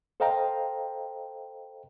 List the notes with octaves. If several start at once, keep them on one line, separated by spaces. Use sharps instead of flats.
A4 C5 D#5 F5 G5 A#5